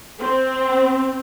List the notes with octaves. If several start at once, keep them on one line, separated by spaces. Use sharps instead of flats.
C4